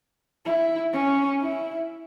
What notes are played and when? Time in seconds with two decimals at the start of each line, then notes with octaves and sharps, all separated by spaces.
0.45 E4
0.93 C#4
1.41 E4